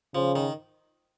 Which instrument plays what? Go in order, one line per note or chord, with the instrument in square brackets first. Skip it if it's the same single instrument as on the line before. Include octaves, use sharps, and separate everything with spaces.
[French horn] C#3 [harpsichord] F3
[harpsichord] D#3